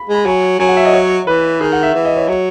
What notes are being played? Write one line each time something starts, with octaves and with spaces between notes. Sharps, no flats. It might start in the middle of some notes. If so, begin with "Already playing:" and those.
Already playing: B5
G#3
B5
F#3 G#5
F#3 G#5
F#5
E5
D#5
C#5
E3 B4
D#3 G#4
F#5
E5
E3
D#5
C#5
F#3